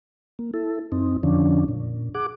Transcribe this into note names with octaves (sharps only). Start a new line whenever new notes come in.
A#3
E4 A4
F#2 C4 D#4
F2 D3 F3 C#4 D4
A#2
G#4 F#5 D6